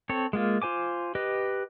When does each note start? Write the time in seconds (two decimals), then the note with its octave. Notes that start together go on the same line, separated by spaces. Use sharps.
0.09 C4 A4 C#5
0.33 G#3 A#3 F4
0.62 F4 C5 G#5 D6
1.15 G4 B4 D#5